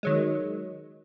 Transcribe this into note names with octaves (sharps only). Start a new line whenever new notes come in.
D#3 F#3 G#3